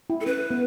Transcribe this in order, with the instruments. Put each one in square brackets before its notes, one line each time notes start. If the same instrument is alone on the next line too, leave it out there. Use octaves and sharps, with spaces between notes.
[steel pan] E4
[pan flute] A4
[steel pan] C#4 [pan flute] B4
[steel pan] B3